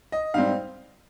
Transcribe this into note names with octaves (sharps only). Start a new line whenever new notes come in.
D#5
G#2 G3 C4 F5